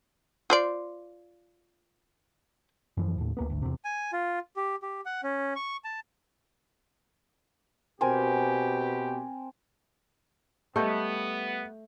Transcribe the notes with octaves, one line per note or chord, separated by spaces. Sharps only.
F4 C5 D5
F#2 E3 F3
D#2 A2
D2 A#3 B3
G#1 D2
E2 C3
G#5
F4
G4
G4
F#5
C#4
C#6
A5
B2 C4 G4 A#4 G#5
G3 A3 B3 D#5 G6